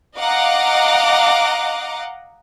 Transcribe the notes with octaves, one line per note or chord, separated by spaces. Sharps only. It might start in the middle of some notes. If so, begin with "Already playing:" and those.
D#5 F5 F#5 A#5 D6